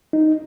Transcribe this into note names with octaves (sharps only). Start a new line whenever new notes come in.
D#4